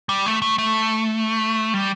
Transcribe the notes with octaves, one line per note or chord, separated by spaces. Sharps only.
G3
A3
A3
A3
G3